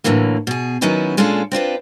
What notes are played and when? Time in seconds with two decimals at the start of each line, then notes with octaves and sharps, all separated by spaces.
0.04 A2 D3 E3 F#3 A#3
0.47 B2 G#4
0.81 D#3 F#3 B3 C#4 D#4 E4
1.17 A#2 G#3 C#4 D4 F4 A4
1.52 C4 D4 F4 B4